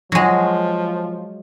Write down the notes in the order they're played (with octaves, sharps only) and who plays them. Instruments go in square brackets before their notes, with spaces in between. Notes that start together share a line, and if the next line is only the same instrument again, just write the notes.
[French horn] F3 [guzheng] F#3 G#3